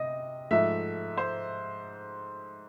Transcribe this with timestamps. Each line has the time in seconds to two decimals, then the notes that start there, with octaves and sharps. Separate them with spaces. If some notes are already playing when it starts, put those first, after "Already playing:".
Already playing: C3 D#5
0.51 G#2 F3 A3 E5
1.17 C5